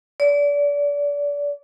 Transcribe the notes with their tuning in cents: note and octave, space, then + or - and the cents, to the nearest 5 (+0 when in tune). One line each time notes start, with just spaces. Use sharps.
D5 -30